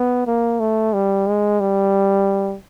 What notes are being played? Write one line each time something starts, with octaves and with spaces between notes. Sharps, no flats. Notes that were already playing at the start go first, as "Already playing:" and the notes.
Already playing: B3
A#3
A3
G3
G#3
G3